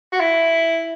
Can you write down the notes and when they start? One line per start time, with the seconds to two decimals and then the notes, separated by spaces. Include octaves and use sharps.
0.12 F#4
0.20 E4